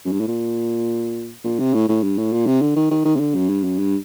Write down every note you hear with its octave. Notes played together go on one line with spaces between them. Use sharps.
F#2
G2
A2
A#2
A#2
C3
A2
A2
G2
A2
A#2
C3
D3
D#3
D#3
D#3
C3
D3
F#2
G2
F#2
G2